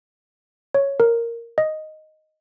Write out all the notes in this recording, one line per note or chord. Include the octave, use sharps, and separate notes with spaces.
C#5
A#4
D#5